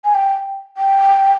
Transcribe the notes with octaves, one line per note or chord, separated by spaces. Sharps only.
G#5
G5
G5